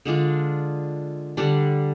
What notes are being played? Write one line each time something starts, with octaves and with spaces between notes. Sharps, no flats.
D3 G#3 D4 F4
D3 G3 D4